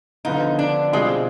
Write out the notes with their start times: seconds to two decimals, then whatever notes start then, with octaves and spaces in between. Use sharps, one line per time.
0.25 D3 F3 B3 D#4 F4
0.59 D4
0.92 B2 G3 G#3 C4 F4 G#4